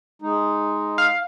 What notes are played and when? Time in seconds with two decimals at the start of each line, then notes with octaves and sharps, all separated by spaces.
0.22 G#3 D#4
0.98 F5